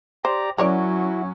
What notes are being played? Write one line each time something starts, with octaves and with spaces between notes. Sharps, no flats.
G4 C5 D5 A#5
F#3 C#4 E4 F#4 A#4 C#5 D5